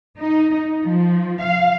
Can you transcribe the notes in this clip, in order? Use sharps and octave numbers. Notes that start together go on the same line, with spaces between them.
D#4
F3
F5